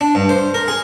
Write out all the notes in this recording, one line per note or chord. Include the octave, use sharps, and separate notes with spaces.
D4
G2
C5
A#4
G#4